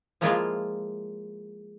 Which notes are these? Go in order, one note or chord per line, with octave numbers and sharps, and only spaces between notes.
F3 G#3 A#3 E4 F4